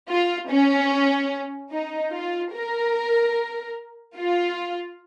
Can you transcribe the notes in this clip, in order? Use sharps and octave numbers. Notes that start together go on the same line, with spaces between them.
F4
C#4
D#4
F4
A#4
F4